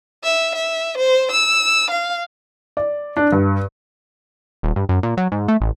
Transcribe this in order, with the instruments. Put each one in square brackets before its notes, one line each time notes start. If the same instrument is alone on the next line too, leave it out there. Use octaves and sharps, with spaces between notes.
[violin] E5
E5
C5
E6
F5
[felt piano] D5
D4
G2
[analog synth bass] D#1
G2
F#2
A#2
F#3
G#2
A3
A1